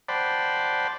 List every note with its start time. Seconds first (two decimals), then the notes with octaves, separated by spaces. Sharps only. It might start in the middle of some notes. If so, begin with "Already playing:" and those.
0.09 C5 D5 F#5 G5 A5 B5